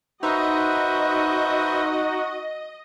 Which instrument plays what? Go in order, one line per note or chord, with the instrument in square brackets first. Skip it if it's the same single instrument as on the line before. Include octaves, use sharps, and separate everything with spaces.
[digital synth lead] D#4 [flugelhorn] F#4 [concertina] B4 C5 E5 [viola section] D#5